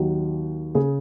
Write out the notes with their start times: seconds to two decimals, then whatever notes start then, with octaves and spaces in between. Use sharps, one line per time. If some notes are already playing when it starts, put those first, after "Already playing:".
Already playing: D#2 D#3 F#3
0.75 C#3 G#4